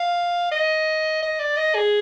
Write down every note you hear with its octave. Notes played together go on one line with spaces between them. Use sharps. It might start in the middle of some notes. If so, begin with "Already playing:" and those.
Already playing: F5
D#5
D#5
D5
D#5
G#4